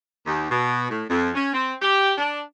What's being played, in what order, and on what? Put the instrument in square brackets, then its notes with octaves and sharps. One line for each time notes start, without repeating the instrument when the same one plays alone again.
[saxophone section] D#2
B2
A2
F2
C#4
C4
G4
D4